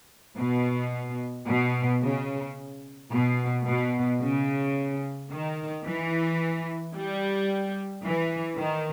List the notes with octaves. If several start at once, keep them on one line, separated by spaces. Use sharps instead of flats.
B2
B2
C#3
B2
B2
C#3
D#3
E3
G3
E3
D#3